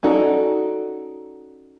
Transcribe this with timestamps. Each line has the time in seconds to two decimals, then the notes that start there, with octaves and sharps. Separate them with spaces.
0.03 C#4 D#4 F#4 A4 D5